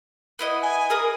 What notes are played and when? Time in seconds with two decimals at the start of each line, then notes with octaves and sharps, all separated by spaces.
0.39 B3 E4 D#5
0.62 G#5
0.90 G#4 A#4 D#6